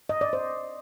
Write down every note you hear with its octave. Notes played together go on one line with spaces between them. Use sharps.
D#5
D5
C5